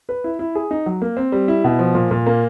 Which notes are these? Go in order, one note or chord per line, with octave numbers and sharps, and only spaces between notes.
B4
E4
E4
G#4
D#4
F#3
A#3
C4
G3
E4
B2
F3
A#2
A#2
A#3